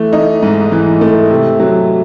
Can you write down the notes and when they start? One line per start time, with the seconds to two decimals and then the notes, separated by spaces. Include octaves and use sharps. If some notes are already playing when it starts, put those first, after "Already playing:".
Already playing: E3 A3
0.13 D#4
0.43 G#2
0.72 E3
1.01 A3
1.30 C3
1.60 F#3